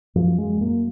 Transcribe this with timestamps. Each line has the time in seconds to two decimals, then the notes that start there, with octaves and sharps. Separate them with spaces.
0.15 F#2 F3
0.38 G#3
0.61 F#2 A#3